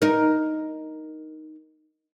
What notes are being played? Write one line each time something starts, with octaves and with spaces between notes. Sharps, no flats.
D#4 A#4